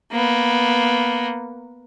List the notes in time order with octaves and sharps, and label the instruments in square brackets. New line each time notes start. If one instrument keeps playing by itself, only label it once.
[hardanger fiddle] A#3 B3